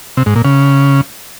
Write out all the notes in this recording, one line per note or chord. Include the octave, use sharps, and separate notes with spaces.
C3
G#2
A#2
C#3